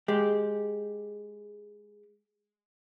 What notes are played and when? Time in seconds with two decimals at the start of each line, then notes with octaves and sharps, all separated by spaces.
0.08 G#3 G4